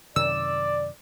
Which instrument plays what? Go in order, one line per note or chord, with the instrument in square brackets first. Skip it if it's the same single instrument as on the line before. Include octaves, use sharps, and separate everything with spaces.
[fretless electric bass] F#2 C3 D#3 [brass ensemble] D5 [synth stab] E6